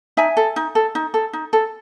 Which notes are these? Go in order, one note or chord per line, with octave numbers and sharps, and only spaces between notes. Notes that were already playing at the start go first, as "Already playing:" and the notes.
D#4 E5 G#5
A4
D#4
A4
D#4
A4
D#4
A4